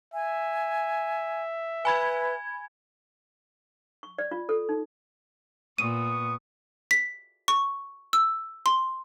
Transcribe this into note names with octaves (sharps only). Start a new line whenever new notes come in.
E5 G#5
B4 G#5 B5 G#6
C#6
D5
F4
A4
D#4
A#2 B3 C#6 D#6 D#7
B6
C#6
E6
C6